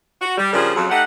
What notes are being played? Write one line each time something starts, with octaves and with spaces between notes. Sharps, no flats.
F#4
G3
C#3 F3 G3 D4 G#4 A#4
F2 C#3 F#3
A3 D#4 G4 F#5